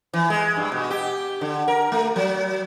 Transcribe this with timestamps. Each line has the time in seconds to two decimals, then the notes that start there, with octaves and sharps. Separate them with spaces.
0.13 E3
0.30 G#3
0.56 G2
0.72 B2
0.90 G4
1.41 D3
1.68 A#4
1.92 A3
2.16 F#3